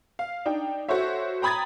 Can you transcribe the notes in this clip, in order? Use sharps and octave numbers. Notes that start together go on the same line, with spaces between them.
F5
D4 D#4 G5
F#4 A4 C5 C#5 E5
G5 A#5 B5 D#6 G#6 A6